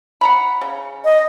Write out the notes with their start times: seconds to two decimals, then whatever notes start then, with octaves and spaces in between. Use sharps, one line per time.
0.21 F#5 A#5 B5
0.61 C#3
1.04 D#5